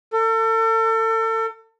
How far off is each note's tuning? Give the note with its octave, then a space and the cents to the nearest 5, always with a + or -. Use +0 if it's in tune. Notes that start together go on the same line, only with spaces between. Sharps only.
A4 +35